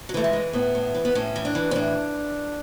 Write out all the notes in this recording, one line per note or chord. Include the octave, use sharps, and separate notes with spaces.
F#3
E3 A3
G#3
E3
A2 B3
A2
E3
B3
A2 C#4
E3
D4
E3
C#4
A2 D4